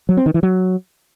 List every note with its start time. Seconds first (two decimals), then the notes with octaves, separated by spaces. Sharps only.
0.09 F#3
0.17 C4
0.26 D#3
0.34 E3
0.43 F#3